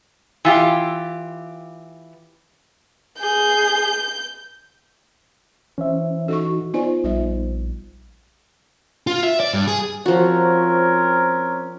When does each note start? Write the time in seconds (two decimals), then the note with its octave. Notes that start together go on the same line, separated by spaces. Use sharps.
0.45 E3 F4 G4
3.21 G#4 G6
5.78 E3 C#4 C5 E5
6.28 D#4 F#4 A4 D#5 C#6
6.74 B3 D#4 F4 C5 D5 G#5
7.04 A#1 G3 F4 E5
9.07 F4
9.23 E5
9.40 D5
9.53 G2
9.68 G#4
10.06 F3 C4 C#4 F#4 A#4